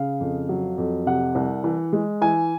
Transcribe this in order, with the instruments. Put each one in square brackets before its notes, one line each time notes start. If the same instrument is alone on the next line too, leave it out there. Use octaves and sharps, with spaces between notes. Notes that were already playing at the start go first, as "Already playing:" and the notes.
Already playing: [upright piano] C#3 F5
F2
F#3
F2
C3 F#5
C2
E3
G#3
E3 G#5